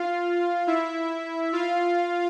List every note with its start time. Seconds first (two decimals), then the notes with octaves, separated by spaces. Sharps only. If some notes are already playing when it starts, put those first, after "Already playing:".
Already playing: F4 F5
0.67 E4 E5
1.53 F4 F5